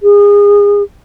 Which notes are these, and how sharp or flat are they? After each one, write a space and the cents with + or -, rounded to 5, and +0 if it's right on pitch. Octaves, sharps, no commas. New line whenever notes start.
G#4 -30